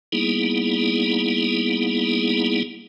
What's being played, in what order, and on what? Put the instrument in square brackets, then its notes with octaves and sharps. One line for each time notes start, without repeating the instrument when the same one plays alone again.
[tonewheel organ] G3 A#3 B3 D#4 E4 G#4